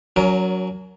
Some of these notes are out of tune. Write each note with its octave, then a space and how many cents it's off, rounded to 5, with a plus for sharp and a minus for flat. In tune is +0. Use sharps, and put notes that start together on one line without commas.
F#3 +0 C#4 +35 A#4 +0